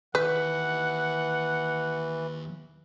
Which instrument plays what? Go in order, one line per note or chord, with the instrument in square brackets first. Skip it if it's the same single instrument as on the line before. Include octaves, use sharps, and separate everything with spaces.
[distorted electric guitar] D#2 [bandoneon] E3 [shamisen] B4 [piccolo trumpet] F#5